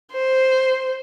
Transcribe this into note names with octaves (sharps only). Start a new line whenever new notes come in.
C5